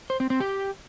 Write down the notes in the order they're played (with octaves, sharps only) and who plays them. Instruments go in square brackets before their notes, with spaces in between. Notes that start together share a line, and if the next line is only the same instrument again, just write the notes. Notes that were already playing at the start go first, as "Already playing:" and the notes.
[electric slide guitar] C5
C4
C4
G4